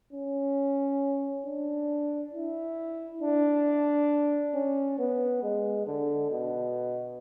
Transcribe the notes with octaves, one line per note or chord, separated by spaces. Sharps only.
C#4
D4
E4
D4
C#4
B3
G#3
D3
B2